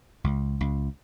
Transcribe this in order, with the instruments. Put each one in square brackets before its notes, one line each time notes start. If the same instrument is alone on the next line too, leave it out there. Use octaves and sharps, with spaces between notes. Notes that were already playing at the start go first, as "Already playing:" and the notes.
[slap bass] C#2
C#2